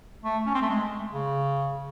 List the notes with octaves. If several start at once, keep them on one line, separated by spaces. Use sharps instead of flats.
A3
C#4
C4
A3
G#3
C#3